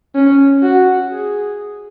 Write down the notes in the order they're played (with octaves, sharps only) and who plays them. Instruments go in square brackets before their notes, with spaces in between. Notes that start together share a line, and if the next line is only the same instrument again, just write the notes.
[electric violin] C#4
F#4
G#4